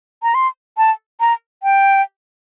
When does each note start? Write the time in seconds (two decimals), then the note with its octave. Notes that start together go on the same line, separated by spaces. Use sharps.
0.23 A#5
0.35 C6
0.78 A5
1.20 A#5
1.63 G5